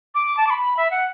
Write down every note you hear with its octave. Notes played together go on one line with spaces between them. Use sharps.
D6
A5
D6
B5
E5
F#5